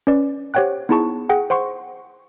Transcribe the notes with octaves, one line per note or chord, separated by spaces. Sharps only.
C#4 B4 D5
G4 C5 C#5 F#5 G5 F#6
B3 D#4 E4 G#4 A5 C#6
G#4 F#5 G5
C5 F#5 C6 C#6